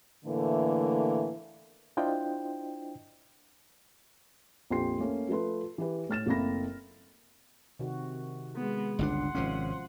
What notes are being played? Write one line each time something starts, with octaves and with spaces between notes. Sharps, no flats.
A2 D3 E3 A3 A#3
D4 E4 F4 C5 D#5 G5
A#1 F2 G4 G5 C6 C7
A3 A#3 C#4
F3 A3 B4 C6
E3 G4 B4
A2 F6 A6 E7
F#1 A3 A#3 C4 B5 A#6
C3 D#3 F#4
G#3 B3
G1 C#2 D4 F#5 C6
G#1 C3 F3 C#4 F4